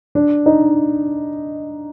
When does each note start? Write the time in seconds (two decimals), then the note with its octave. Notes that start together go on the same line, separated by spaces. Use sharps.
0.15 D4
0.46 D#4